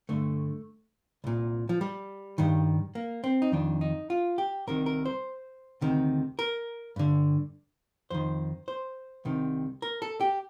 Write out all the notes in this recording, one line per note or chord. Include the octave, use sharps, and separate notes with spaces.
G2 D3 A3
C2 A#2
F3
G3
G2 D#3
A#3
C4
D#4
F2 D#3 D4
D#4
F4
G4
C2 C3 D#3 A#4
A#4
C5
D2 C3 D#3
A#4
G2 D3
F2 D#3 C5
C5
C2 C3 D#3
A#4
A4
G4